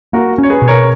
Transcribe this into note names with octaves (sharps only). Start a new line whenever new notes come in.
A#3 F#4 A#4
C#4
C#5
G#4 B4
B2
A#4 C#5